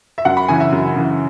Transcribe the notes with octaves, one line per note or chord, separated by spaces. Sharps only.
E5
F#2 F#5
B5
C#3 E3 G#5
E5
F#2
C#3 E3